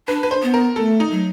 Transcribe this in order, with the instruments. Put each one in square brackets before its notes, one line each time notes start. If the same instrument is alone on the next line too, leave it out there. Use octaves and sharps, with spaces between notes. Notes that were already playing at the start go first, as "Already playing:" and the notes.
[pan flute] D4 [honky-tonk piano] B4
[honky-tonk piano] B4
C5
[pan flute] B3
[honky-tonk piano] A#4
[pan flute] A3 [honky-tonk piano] A4
[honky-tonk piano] D#4
[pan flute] F#3